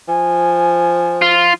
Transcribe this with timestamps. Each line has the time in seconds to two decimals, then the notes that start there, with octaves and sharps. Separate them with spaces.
0.08 F3 G#5
1.22 F4